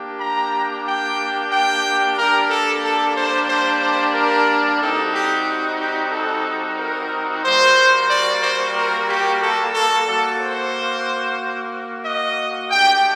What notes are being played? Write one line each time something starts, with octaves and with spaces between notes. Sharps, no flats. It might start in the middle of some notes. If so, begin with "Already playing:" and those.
Already playing: A#3 D4 G4
A#5
G5
G5
G3 A#3 D4 G4 A#4
A4
A4
C5
C5
C5
A#4
G3 C4 D#4 F#4 A4
G4
G4
A4
A#4
G3 A#3 F#4 C5
D5
C5
A#4
G4
A4
A4
A#3 F#4 A4
C5
D#5
A3 D4 G4 G5